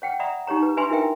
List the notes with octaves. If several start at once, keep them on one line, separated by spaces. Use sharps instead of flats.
C#5 F#5 G5
D5 E5 F#5 A#5 B5 D#6
D#4 G4 C#5 A#5
B4
D4 B4 E5 G#5 B5 C6
E4 F4 A#4 E5 G5